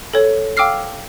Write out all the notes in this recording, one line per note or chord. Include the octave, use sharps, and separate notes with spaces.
A4 C#5
F5 G5 D6 E6 F6 C7